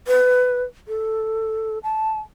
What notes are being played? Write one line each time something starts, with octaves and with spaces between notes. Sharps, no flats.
B4
A4
A5